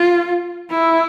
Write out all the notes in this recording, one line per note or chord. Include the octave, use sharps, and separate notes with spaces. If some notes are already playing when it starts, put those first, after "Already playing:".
Already playing: F4
E4